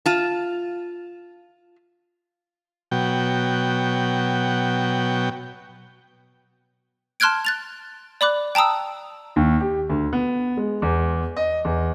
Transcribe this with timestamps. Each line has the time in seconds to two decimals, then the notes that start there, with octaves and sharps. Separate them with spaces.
0.06 F4 A5
2.91 B2 F#3 G5
7.20 A5 C6 F6 F#6 G#6 D7
7.45 F#6 A6 F7
8.21 D5 B5 D6 F#6
8.55 G5 A5 A#5 D#6 E6
9.36 D#2
9.60 G4
9.90 D2
10.13 B3
10.57 G#3
10.82 E2
11.36 D#5
11.65 E2